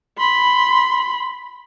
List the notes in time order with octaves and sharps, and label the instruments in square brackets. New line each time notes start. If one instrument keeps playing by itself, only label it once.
[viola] B5 C6